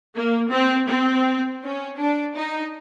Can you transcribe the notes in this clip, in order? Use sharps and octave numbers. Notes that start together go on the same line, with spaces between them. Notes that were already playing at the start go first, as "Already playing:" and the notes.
A#3
C4
C4
C#4
D4
D#4